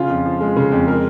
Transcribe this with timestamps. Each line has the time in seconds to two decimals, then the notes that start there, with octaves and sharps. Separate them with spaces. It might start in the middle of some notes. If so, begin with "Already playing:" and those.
Already playing: C#3 F4
0.09 F2
0.26 F3
0.41 G#3
0.56 C#3
0.72 F2
0.87 G#3 A#4